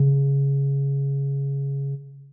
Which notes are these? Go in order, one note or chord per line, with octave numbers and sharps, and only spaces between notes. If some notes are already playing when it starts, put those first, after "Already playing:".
Already playing: C#3